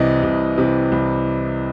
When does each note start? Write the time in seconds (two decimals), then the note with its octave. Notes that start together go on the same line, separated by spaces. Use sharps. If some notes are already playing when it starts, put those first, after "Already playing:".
Already playing: C2 C3 E3 D#5
0.23 C2
0.58 C3 E3
0.92 C2